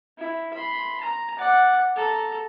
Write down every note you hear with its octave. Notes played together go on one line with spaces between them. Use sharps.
E4
B5 C6
A#5
D5 F#5
A4 A#5